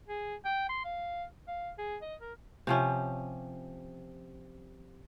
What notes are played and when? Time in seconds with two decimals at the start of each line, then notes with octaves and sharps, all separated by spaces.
0.08 G#4
0.45 G5
0.69 C6
0.85 F5
1.48 F5
1.78 G#4
2.02 D#5
2.21 A#4
2.67 C3 F3 C#4